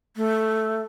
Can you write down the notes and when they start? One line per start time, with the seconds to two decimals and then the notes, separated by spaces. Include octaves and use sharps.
0.17 A3